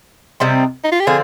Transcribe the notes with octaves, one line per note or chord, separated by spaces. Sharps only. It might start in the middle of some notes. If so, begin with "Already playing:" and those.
C3 G3 C4 D#4
D#4
F4
G4
D3 F3 C4 G#4